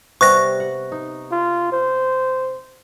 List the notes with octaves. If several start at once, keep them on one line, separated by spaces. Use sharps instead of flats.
C3 G3 B3 C#6 F#6 A#6
F#5
D#4
F4
C5